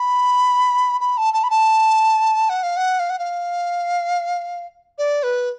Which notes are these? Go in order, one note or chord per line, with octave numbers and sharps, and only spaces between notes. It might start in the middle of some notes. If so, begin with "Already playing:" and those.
Already playing: B5
B5
A5
A5
B5
A5
F#5
F5
F#5
F5
F#5
F5
D5
B4